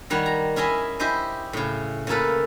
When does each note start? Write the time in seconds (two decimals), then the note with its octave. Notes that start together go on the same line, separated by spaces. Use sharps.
0.10 D#3 G3 C#5 F#5
0.26 A#5
0.56 C#4 E4 G#4 D#5 E5
1.00 E4 G4 C5 D#5
1.53 A2 C#3
2.07 C#3 A3 A#3 A4 B4